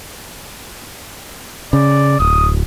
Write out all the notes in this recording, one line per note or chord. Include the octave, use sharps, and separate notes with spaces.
C#3 D5
D1 D#6